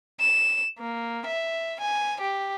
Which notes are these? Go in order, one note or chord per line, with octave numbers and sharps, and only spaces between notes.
E7
A#3
E5
G#5
G4